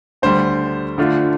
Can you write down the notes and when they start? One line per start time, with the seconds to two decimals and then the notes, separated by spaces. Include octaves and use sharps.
0.22 D2 D3 G3 C5
0.98 D3 A3 D4 F4